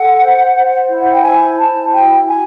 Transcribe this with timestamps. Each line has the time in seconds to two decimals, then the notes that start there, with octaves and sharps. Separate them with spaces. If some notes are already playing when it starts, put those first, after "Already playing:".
Already playing: A4 F#5
0.19 C5
0.53 C5
0.88 E4
0.99 F#5
1.11 G5
1.22 C5 G#5
1.57 E4 A5
1.92 F#4 G5
2.26 F#4 G#5